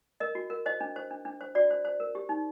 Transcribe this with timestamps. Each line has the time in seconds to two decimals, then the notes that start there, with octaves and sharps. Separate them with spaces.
0.20 A#4 D#5
0.35 F#4
0.50 A#4
0.66 C5 D#5
0.81 D4
0.96 C5
1.10 D4
1.25 D4
1.41 C5
1.55 F#4 D5
1.71 C5
1.85 C5
2.00 A#4
2.15 G4
2.29 D#4